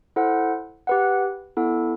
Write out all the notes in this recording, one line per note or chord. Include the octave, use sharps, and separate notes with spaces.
E4 A4 C5 F#5
G4 B4 F#5
B3 E4 A4